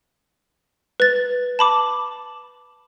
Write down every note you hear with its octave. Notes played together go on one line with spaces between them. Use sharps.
B4 A6
A5 B5 D6